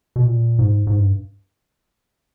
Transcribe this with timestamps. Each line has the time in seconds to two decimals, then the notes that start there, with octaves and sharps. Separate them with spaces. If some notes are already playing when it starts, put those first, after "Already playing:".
0.16 B2
0.26 A#2
0.59 G#2
0.87 G#2
0.99 G2